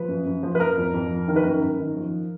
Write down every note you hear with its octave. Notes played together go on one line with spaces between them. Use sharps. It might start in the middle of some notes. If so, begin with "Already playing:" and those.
Already playing: F3 B4
F#2
F#2
F3
B4
F3 A#4
F2
F2
F3
D#3 A#4
B4
F#2 A#4
F#2 A#4
D#3
F3